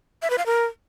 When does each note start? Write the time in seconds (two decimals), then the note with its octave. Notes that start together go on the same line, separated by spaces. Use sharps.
0.22 E5
0.30 B4
0.38 F5
0.46 A#4